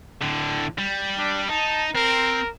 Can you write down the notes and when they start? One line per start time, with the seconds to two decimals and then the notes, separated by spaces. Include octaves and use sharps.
0.21 A2 D3
0.78 G3
1.18 D4
1.49 D#4 A5
1.95 C4 A#4